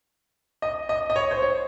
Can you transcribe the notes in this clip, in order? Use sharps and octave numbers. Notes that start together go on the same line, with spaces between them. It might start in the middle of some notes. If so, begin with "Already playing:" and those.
D#5
D#5
D#5
C#5
C5
C#5